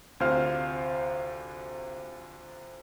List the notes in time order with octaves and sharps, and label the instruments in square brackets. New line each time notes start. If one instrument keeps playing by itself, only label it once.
[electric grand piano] D2 C3 F4 C5 F5 F6